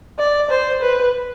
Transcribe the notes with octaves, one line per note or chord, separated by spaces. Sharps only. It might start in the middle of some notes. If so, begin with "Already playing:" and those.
D5
C5
B4